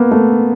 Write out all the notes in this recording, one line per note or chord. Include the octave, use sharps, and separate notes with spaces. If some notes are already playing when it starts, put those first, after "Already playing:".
Already playing: A#3 B3
A3